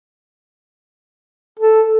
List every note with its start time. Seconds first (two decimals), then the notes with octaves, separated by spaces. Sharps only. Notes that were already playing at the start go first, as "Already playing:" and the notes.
1.60 A4